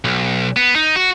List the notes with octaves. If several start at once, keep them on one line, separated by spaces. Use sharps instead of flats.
B1
B3
D#4
F#4